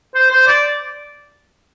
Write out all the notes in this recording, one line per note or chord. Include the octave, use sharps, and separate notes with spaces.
C5
C5
D5